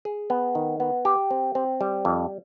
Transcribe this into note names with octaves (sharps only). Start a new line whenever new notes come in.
G#4
B3
D#3
B3
G4
C4
C4
G3
F2